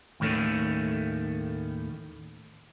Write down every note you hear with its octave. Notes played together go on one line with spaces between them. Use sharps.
D#2 A2 D#3 A3 C#4